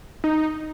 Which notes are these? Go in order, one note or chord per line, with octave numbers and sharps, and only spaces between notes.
D#4